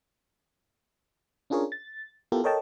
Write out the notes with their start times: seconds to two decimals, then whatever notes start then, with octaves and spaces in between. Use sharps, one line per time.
1.50 C#4 D4 F4 G#4 A#4 C#5
1.72 A6
2.32 B3 E4 F4 G4 A4 A#4
2.44 A4 A#4 C#5 D#5 G5 A5